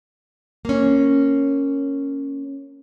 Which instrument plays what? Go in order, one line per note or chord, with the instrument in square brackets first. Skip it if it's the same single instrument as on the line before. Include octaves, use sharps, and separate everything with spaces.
[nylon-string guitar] A#3 C#4